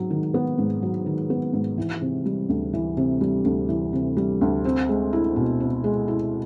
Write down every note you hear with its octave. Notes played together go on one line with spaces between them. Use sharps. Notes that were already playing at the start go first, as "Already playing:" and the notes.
Already playing: G#2 F#3
D#3
B3
G#2
F#3
D#3
B3
G#2
E3
C3
G3
D2
E3
C3
G3
D2
E3
C3
G3
D2
C4
G#3
E4
B2
C4
G#3
E4